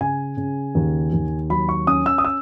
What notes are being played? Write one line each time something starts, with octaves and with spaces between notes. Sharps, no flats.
C#3 G#5
C#3
D#2
D#2
F#3 B5
C#6
C#4 D#6
E6
D#6
E6